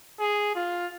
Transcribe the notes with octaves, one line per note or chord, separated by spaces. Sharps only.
G#4
F4